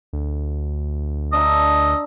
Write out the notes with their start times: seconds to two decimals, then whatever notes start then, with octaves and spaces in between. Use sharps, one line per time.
0.13 D2
1.33 D4 D#5 E5 A#5